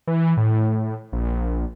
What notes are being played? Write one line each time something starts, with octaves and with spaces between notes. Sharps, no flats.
E3
A2
A#1